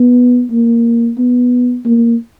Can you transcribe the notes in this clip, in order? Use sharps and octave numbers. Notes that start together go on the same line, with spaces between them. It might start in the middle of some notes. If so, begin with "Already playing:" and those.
Already playing: B3
A#3
B3
A#3